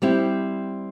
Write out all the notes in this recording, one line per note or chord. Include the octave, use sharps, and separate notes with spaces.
G3 C4 E4 G4